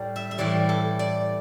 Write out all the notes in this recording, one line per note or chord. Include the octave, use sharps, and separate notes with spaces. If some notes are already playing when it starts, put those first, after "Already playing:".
Already playing: A2 G3 D5
E5
E5
A2 E3 G3 D5
A4
D5